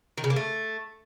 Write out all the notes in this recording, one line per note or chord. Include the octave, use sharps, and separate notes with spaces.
D#3
C#3
A#3
A3